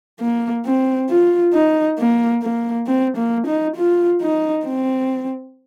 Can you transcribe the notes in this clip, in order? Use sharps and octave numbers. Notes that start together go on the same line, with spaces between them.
A#3
C4
F4
D#4
A#3
A#3
C4
A#3
D#4
F4
D#4
C4